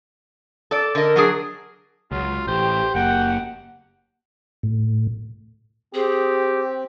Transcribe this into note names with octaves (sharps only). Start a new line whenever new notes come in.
A4 D5
D3 A#4 D#5
F#3 D4 G#4
C#2 F#3 F4
A1 G4 C5
F#1 A#3 F#5 G5
A2
C4 G4 G#4